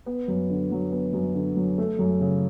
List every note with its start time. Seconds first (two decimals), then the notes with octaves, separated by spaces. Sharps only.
0.06 B3
0.28 F#2
0.50 D3
0.72 F#3
0.92 B3
1.13 F#2
1.35 D3
1.56 F#3
1.78 A3
1.99 F#2
2.21 C#3